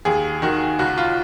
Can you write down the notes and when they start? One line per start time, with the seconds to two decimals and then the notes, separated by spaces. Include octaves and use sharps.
0.05 D#2 G#4
0.42 D#3 F#4
0.79 C#2 F#4
0.98 F4